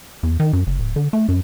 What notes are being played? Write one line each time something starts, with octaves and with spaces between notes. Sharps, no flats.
E2
D#3
F#2
F#1
D1
D3
A3
F#2